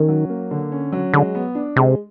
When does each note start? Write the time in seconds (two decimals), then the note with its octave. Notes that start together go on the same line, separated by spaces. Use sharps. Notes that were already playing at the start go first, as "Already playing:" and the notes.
Already playing: D#3 C#4
0.08 F#3
0.30 A#3
0.51 D3
0.72 C#4
0.92 F#3
1.14 D3 G#3
1.35 B3
1.55 D4
1.76 C3 G#3